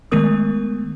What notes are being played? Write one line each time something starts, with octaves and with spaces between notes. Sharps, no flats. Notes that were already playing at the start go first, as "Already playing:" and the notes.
D#3 G#3 A3 B3 A#4 D#6